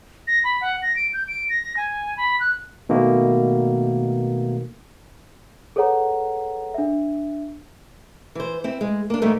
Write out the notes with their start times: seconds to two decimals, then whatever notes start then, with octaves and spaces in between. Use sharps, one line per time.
0.27 A#6
0.44 B5
0.61 F#5
0.82 A#6
0.96 D7
1.14 G6
1.28 D7
1.50 A#6
1.77 G#5
2.17 B5
2.40 F#6
2.89 B2 D#3 A3 A#3
5.76 G#4 A4 B4 C#5 F#5 A#5
6.74 D4 E5
8.35 E3 C5
8.64 C4 E4
8.81 G#3
9.10 A#3 D4
9.22 G#2 C3 D#3 G3 A3 A#3